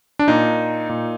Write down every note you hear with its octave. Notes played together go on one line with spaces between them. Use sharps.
D4
A#2 D#4
A#2